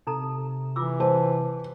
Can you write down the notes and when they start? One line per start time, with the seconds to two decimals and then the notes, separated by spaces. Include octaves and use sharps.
0.07 C3 D#4 A4 A#5
0.76 E3 F4 D6 E6
1.00 C5 A5